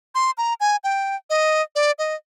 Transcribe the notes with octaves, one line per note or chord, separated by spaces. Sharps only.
C6
A#5
G#5
G5
D#5
D5
D#5